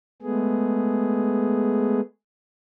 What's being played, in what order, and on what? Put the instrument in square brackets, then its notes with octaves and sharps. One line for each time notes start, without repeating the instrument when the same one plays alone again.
[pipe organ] G#3 A3 B3 G#4